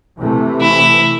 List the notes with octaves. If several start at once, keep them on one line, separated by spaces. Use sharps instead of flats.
C3 E3 A3
E4